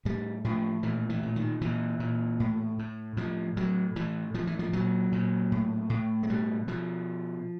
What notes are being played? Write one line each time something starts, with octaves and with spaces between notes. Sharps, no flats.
A2 G3
A2 F3
A#2 E3
E3
A#2
D#3
A#2 E3
A#2
A2
A2
A2 F3
A2 F#3
A2 E3
A2 F3
E3
F3
A#2 F#3
A#2
A2
A2
G#3
B2 G3
B2 F3